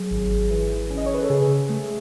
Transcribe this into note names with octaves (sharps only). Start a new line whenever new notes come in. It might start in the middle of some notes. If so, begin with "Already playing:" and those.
Already playing: F#3 G#4
G#1
E3
C#4
D#5
C#5
B4
A4
C#3 G#4
A3